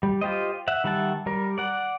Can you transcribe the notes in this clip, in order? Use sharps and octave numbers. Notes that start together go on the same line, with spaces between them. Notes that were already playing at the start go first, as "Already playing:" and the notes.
G3
F4 G4 C5 D#5
E5 F#5
D#3 G3 E5 F#5 A5
G3 A#4
D5 F#5